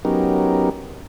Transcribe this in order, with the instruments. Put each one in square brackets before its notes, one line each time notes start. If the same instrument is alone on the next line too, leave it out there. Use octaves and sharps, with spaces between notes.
[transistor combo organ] F#3 B3 C#4 D#4 G4 A#4